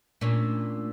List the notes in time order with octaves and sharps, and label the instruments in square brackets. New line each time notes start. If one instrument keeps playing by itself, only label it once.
[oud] A#2 C#4 [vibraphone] A3 D4 E6